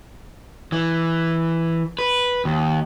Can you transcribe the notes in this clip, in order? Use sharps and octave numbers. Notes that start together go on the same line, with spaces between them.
E3
B4
D#2